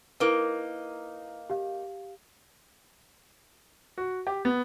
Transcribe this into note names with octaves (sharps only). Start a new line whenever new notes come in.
A#3 D#4 E4 A#4 B4
G4 F5
F#4
G4
B3